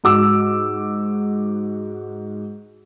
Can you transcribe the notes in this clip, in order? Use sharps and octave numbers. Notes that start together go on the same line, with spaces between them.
G#2 F#4 D6 E6